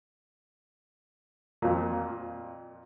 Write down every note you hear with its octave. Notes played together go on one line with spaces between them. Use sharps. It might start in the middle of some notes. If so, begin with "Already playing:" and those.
F2 A#2